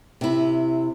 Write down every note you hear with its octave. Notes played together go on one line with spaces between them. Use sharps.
C3 E4